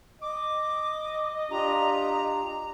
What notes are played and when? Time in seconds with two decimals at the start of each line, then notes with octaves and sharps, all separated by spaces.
0.22 D#5 D6
1.51 D4 F4 G4 A#5